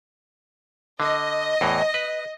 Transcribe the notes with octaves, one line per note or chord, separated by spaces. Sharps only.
D3 D#5
E2 A2 E3
B4